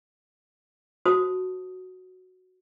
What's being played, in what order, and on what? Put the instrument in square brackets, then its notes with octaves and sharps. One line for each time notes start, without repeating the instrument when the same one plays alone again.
[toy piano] F#4 C5 A5 D#6